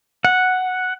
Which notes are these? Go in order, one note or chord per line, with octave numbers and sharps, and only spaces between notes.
F#5